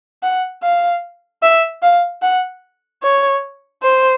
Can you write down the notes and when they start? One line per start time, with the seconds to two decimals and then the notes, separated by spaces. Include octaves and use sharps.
0.23 F#5
0.63 F5
1.43 E5
1.83 F5
2.22 F#5
3.03 C#5
3.83 C5